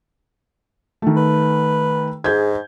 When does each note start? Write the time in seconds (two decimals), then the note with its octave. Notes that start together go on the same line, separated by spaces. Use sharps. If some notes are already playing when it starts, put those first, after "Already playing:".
1.02 D#3 A3
1.16 B4
2.24 G#2 G#4 G6 G#6